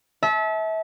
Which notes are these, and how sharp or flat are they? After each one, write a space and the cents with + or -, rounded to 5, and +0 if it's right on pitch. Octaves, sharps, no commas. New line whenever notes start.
E5 -30 A5 -30